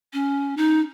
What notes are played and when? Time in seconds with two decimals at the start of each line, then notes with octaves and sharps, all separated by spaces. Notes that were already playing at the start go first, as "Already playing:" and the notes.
0.13 C#4
0.57 D#4